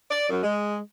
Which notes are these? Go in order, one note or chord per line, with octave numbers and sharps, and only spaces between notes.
D5
F#2
G#3